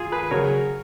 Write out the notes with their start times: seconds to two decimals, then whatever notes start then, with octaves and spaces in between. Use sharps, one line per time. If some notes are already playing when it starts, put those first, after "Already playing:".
Already playing: F4 G#4
0.12 G#4 B4
0.31 C#3 F#3 C#4 G#4 A#4 C#5